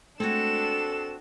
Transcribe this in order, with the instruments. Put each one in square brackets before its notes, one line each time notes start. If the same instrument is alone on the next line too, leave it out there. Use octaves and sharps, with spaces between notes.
[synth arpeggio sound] G#3 A3 [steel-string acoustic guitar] C4 F#4 [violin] D4 E7 [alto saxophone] A4